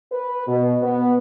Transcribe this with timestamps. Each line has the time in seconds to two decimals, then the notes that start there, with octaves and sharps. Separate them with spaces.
0.11 B4
0.47 B2
0.82 B3